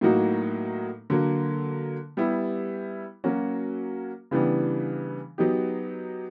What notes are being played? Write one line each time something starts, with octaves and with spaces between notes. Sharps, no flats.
A2 F#3 A#3 D#4 F#4
D3 F#3 A#3
G3 B3 E4 G4
F#3 A#3 C#4 F#4
C#3 E3 G3 B3 D4
F#3 B3 D#4 G4